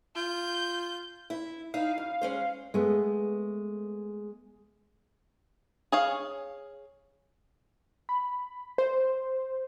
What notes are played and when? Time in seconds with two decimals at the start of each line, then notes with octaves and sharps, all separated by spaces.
0.16 F4 G6
1.30 E4
1.74 D#4 E4 F5
1.98 F#2
2.21 G#3 C#4 C5
2.74 G#3 A3 B3
5.92 G#4 C#5 F5
8.09 B5
8.78 C5